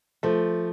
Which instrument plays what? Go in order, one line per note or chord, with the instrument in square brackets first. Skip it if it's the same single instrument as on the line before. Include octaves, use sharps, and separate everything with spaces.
[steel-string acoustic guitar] F3 [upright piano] A3